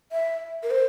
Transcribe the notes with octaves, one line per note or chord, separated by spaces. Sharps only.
E5
A#4
C5